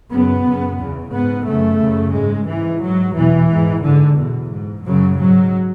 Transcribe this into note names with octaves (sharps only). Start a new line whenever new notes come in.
F#2 C#3 B3
F#2 C#3
E2 C#3
G#2 B3
C#3 A3
F#2
F#2 C#3
G#2 G#3
G#2 E3
G#2 F#3
E2 B2 E3
G#2
G#2 D3
E2 B2
G#2
F#2 C#3 F#3
G#2 F#3